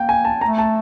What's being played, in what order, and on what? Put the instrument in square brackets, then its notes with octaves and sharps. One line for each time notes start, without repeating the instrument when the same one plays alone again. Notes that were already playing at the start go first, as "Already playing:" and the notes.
Already playing: [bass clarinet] A#3 [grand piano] G5
[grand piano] G#5
A5
[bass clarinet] A3 [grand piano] A#5
[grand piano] A5